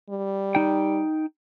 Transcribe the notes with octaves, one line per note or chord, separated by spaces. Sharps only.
G3
D#4 G5